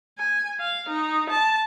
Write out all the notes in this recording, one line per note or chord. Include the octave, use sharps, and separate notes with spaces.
G#5
F5
D#4
A5